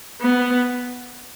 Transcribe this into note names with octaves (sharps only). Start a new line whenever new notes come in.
B3